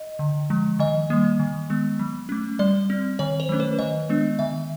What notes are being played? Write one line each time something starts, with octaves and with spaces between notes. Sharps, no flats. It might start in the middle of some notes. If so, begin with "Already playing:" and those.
Already playing: D#5
D3
F3 G#3
D#3 D#5
G3 A#3
D#3
G#3 B3
F#3
A3 C#4
G3 D5
C4
D#3 C#5
C5
F#3 A3 C#4
B4
D#3 D#5
G#3 B3 D4
D#3 E5